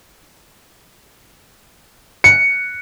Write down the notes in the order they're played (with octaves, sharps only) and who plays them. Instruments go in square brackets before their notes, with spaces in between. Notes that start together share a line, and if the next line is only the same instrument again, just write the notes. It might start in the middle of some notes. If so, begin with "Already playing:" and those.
[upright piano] C#7